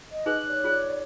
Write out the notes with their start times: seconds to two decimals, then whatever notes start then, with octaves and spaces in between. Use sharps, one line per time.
0.11 D#5
0.26 D#4 G#4 B4 F#6
0.48 C#5 D5
0.64 F4 G#4